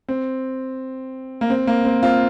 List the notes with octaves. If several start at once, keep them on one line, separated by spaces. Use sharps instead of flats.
C4
A#3
C4
A#3
C4
C4 F4